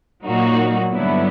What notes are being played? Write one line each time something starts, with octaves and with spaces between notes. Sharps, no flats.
A#2 F#3 A#3 D#4 F#4
G2 D3 F#3 B3 E4